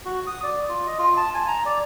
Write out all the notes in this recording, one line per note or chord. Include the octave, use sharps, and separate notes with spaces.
F#4
D#6
D5
F4
D#5
F4
A5
G#5
A#5
D5